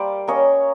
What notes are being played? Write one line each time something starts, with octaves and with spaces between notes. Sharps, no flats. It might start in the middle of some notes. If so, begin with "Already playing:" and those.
Already playing: G3 A#3 C5 D5 F5
A#3 C#4 C#5 D#5